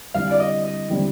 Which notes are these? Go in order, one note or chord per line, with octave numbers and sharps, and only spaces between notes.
D3 G3 C4 E4 F5
D5
D#5
D#5
D3 G3 C4 E4